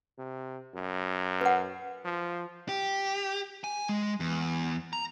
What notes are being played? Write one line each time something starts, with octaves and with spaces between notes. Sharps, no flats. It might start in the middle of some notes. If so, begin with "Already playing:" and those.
C3
F#2
B4 F#5
F3
G4
G#5
G#3
E2
A#5